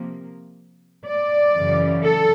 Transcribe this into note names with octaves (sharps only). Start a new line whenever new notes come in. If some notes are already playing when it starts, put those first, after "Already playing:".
Already playing: C3 F3 A#3
D5
F#2 C#3 E3
A4